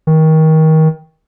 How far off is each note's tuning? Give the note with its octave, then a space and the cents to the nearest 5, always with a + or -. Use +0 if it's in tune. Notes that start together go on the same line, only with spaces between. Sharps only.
D#3 +25